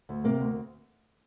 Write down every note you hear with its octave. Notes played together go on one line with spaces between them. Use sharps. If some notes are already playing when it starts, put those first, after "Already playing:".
D2
C3 A#3
D2